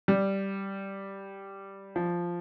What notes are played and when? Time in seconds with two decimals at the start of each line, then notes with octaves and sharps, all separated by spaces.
0.08 G3
1.96 F3